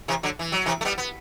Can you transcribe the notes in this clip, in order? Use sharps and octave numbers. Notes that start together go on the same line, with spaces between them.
C3 E3
D3 F#3
E3
F#3
C3 E3
A3
G3 B3
B3